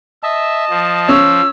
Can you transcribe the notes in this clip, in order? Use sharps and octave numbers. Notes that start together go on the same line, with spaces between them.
D#5 E5 A5
F3
C#4 E6